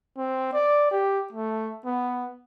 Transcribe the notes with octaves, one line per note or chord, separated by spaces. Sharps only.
C4
D5
G4
A3
B3